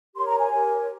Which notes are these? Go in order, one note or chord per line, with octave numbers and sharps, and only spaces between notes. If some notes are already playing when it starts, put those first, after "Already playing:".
G4 A#4 C#5 C6
A#5
G#5
G4 A#4 C#5